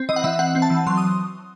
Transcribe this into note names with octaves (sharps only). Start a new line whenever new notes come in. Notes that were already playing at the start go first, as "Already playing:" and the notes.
Already playing: C4
E3 D#5
F#5
E3 E5
C4 F#5
C4
A5
E3
F#3 C6
D#6